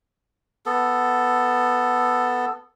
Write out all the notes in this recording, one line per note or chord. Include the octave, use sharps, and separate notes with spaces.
B3 A4